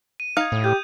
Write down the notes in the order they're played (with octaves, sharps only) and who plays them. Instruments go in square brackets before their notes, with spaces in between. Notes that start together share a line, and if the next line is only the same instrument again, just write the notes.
[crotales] D#7
[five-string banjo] D#4 F5 [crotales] D#6 G#6
[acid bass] A2
[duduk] G4 [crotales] G6